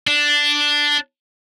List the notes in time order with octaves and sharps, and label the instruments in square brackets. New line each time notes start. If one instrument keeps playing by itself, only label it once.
[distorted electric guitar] D4